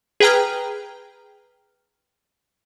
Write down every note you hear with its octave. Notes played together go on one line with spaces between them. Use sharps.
G#4 B4 G5 A#5 F6